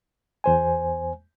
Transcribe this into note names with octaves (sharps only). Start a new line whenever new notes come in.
E2 C5 G#5